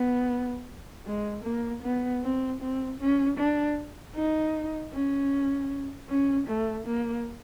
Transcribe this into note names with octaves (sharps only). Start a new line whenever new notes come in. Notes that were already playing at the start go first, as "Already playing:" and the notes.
Already playing: B3
G#3
A#3
B3
C4
C4
C#4
D4
D#4
C#4
C#4
A3
A#3